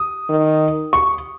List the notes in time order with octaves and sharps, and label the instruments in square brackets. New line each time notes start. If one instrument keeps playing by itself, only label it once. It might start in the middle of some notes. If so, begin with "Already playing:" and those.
Already playing: [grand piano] D#6
[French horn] D#3
[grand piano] C#6